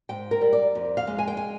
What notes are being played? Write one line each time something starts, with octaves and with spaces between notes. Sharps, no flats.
G#2 G5
A#4
G3
D5
F2
F5
G#3
G#5
G5
G#5